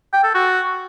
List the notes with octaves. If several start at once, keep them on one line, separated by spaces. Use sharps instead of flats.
G5
A4
F#4